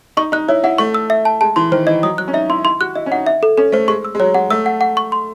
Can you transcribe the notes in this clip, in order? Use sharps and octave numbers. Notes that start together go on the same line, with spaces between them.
D#4 C#6
D#4 F#6
E4 C#5
E4 F#5
A3 C#6
E6
E5
A5
G#3 A5
E3 C6
D#3 C5
E3 D#5
F#3 D#6
F#3 F#6
C#4
D#4 E5
E4 C6
E4 C6
F#4 F#6
E4 D#5
C#4
D#4 F#5
E5
A4
C#4 A4
A3 C5
G#3 C#6
E6
G#3
F#3 C#5
G#3 F#5
A3 E6
F#5
F#5
C#6
C6